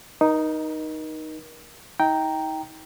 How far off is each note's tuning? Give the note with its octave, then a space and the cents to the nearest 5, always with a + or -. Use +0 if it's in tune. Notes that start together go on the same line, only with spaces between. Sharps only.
D#4 +0 A#4 +35
D#4 +40 G5 -5 A#5 +0